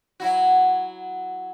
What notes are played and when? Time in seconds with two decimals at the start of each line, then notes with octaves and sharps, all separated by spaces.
0.20 F#3 E4 F#4